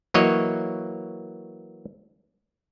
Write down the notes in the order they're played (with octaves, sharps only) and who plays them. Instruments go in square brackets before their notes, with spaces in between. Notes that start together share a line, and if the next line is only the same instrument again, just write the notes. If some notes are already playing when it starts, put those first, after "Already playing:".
[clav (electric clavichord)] E3 F#3 A#3 C#5 D#5